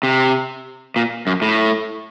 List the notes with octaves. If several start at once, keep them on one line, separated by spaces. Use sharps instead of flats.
C3
A#2
F#2
A2